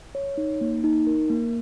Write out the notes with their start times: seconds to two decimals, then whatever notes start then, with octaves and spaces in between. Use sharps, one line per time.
0.15 C#5
0.38 D#4
0.61 A#3
0.84 D#4
1.07 A#4
1.30 A#3